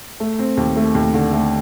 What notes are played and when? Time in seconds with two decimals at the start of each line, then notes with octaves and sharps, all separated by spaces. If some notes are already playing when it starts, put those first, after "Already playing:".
0.20 A3
0.39 C4
0.57 D#2
0.76 A3
0.95 D#2
1.14 D3
1.33 A3